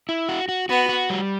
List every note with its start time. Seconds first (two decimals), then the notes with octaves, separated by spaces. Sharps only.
0.09 E4
0.29 F#4
0.49 F#4
0.69 B3 F#4
0.89 F#4
1.10 G3